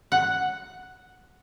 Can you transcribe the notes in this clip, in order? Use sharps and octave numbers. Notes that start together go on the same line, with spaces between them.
F#5